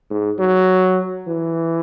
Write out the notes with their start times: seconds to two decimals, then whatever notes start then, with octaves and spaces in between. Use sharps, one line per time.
0.10 G#2
0.39 F#3
1.27 E3